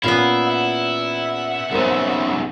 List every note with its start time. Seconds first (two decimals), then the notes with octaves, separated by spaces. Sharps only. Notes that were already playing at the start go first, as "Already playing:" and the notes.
0.04 A#2 B3 C#4 E4 F4 F5
0.47 E5 F#5
1.72 B1 C#3 A#4 C5